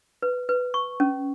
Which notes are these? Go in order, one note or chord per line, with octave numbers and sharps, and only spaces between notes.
B4
B4
C#6
C#4